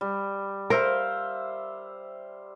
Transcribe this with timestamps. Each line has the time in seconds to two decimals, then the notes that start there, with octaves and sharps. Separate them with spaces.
0.01 G3
0.70 A#4 C5 E5 F5